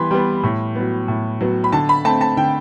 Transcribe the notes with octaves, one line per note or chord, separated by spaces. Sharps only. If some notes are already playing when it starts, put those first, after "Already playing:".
Already playing: E3 G3 B3 B5 C6
G3 B3
A2
F#3 B3
A2
F#3 B3
B5
D3 A5
B5
A3 C4 A5
A5
D3 G5